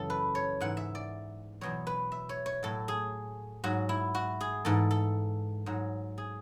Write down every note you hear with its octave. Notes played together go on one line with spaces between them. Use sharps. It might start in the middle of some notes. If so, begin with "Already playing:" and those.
Already playing: F#2 C#3 E3 A4
B4
C#5
G#2 E3 F#5
E5
D5
E2 B2 F#3 C#5
B4
E5
C#5
C#5
A2 F#3 A4
G#4
G#2 F#3 F#4
E4
F#4
G#4
G#2 E3 A4
A4
G#2 F#3
G#4